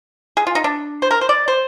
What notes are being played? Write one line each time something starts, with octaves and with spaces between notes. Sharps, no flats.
G#4
F4
D#4
D4
C5
A#4
C5
D5
C5